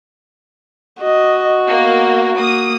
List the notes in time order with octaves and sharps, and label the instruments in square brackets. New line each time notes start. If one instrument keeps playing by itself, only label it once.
[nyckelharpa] F#4 [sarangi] D#5
[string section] A#3 [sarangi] B3
[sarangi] A#3 [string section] D#6